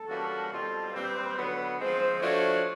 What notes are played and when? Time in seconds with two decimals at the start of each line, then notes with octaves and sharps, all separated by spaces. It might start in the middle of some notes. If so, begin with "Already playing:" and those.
Already playing: A4
0.09 E3 G3 A#3 C#4 F#4
0.51 B2 G3 C4 F4 A4
0.93 A#2 G3 C4 B4
1.37 D3 F#3 B3
1.79 F3 G#3 C4 C5
2.21 F3 A3 D4 F#4 C#5